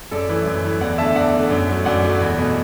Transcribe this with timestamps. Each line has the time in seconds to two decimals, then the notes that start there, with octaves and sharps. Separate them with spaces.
0.11 F#2 A4 D5
0.29 E3 A3
0.46 F#2
0.65 E3 A3
0.81 E2 D5 F#5
0.98 D3 A3 E5 A5
1.16 E2 D5 F#5
1.34 D3 A3
1.51 F#2
1.69 F#3 A3
1.85 F#2 D5 F#5
2.04 F#3 A3
2.21 E2
2.38 B2 A3